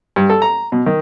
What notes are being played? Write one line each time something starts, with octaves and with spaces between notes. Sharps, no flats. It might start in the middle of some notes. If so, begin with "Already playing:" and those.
G2
A4
A#5
B2
D#3